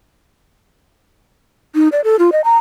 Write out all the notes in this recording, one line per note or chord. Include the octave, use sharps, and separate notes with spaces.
D#4
D5
A4
F4
D#5
A#5